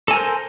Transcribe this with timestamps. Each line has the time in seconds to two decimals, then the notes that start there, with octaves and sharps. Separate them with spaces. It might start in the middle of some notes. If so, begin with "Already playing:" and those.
0.08 A4
0.11 G#5
0.13 A#4
0.16 C5